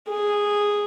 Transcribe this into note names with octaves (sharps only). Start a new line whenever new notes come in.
G#4